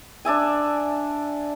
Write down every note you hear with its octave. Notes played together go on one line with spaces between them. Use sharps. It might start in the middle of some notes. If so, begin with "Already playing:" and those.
D4 D5 E5 G#5